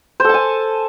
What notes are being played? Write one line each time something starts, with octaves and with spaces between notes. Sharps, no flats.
A4 C5 G#5 A5